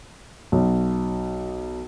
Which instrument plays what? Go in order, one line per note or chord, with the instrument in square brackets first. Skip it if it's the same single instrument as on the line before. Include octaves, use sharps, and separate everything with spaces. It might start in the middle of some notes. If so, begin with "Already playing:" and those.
[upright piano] B1